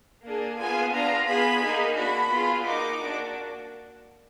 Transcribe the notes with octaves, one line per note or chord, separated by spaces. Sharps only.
A#3 D4 G#4
B3 F4 G#4 G#5
B3 D4 F4 A#5
B3 F4 G#4 B5
A#3 D#4 G#4
D4 F#4 B5
B3 F4 G#4
A#3 D#4 F#4 D6
A#3 D4 F#4